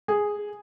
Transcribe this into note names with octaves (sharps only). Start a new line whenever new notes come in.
G#4